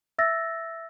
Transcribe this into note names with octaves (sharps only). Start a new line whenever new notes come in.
E5 E6 A6 A#6